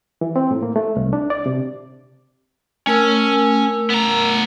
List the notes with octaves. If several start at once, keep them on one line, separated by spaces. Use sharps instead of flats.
E3
C4
A2
A#3
A3
C2
D4
D5
C3
A3 C#4 A#4 E6
B3 A#5